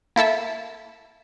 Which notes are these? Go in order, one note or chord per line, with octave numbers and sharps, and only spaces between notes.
A#3 E4 A4 E5